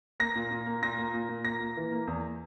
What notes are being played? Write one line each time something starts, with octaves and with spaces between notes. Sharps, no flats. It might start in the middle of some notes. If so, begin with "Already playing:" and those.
A#3 A#6
A#2
A#2
A#3
A#2 A#6
A#3
A#2
A#2
A#3 A#6
A#3
E3
A#3
E2